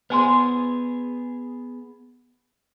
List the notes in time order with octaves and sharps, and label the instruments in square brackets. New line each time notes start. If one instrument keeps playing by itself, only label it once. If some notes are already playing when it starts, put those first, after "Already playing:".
[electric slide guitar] B3 G#4 [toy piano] C5 G#5 C6